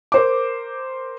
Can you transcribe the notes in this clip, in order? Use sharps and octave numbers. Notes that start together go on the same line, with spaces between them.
A#4 C5 D6